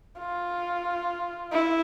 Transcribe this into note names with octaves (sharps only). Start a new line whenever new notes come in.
F4
E4